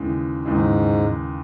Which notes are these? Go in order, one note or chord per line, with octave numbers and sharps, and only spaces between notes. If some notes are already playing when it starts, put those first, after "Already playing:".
Already playing: D#2 C#3 E3 G#3
D#2 G#2 C#3 E3 G#3